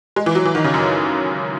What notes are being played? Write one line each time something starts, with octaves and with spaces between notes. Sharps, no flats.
G#3
E3
F#3
E3
D#3
C#3
F#2